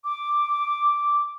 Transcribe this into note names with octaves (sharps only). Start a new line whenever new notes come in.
D6